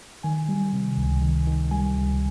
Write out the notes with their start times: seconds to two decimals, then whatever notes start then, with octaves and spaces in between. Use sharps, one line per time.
0.23 D#3 G#5
0.48 G3
0.73 C3
0.97 C#2
1.22 D#3
1.47 D#3
1.71 G3 G#5
1.96 C#2